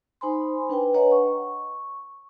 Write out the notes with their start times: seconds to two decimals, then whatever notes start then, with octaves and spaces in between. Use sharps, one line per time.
0.21 D#4 C5 G#5 B5 C6
0.70 D4 B4 G5 G#5
0.94 B4 C#5 D#5 F#5 A#5
1.12 C#6